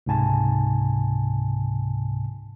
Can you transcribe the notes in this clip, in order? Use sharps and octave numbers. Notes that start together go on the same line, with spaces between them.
C#2 G#2 C3 G#5 A5